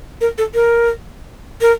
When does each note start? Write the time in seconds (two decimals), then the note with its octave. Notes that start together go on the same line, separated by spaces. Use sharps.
0.21 A#4
0.38 A4
0.54 A#4
1.61 A#4